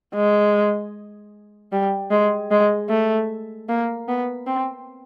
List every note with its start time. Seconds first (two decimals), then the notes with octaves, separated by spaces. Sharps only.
0.15 G#3
1.72 G3
2.11 G#3
2.51 G#3
2.89 A3
3.69 A#3
4.09 B3
4.47 C4